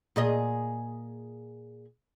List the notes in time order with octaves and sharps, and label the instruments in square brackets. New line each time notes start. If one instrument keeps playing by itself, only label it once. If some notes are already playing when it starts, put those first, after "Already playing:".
[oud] A#2 G#4 D#5